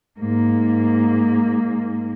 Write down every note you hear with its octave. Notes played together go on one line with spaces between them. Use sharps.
G#2 A#3